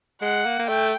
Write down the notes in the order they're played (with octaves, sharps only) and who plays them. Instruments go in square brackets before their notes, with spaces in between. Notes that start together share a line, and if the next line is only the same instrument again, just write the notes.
[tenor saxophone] G#3 [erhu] F#5
[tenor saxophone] A#3
A#3
[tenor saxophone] A3 [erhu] G5